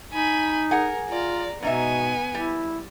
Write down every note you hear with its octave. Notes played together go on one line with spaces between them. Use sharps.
D#4 G#5 B5
G#4 A#4 F#5 G#5
F4 D5 A#5
G#2 B2 B3 D#4 E5 G#5
G3 E4